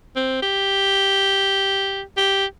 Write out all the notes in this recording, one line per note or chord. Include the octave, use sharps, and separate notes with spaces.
C4
G4
G4